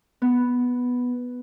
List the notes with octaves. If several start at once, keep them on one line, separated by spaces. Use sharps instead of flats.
B3